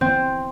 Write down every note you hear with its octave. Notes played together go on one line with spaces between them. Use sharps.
C4